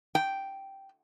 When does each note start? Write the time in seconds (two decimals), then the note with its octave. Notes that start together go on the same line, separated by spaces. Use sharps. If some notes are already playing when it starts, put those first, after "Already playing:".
0.15 G5